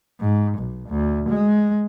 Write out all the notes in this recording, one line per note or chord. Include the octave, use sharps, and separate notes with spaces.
G#2
B1
D2
G#3